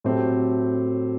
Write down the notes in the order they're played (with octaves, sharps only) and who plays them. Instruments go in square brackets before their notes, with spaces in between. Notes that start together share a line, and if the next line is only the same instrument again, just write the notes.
[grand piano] A2 F#3 A3 C4 G4